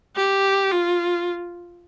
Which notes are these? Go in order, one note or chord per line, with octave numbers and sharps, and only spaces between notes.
G4
F4